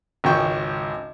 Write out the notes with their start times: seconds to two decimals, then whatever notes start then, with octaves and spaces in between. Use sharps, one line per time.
0.24 G#1 C#2 G5 C#6